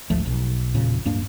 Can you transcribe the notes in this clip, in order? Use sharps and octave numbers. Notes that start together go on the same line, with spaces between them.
G#1 D2 F3 A3
B1
E1 A#2 C#3
D1 G2 A#3 D4